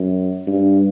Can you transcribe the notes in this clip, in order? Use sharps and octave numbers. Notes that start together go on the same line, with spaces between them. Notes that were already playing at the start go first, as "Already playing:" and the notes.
Already playing: F#2
G2